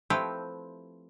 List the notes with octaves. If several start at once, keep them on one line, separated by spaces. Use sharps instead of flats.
F3 A3 C4 E4 G4 B4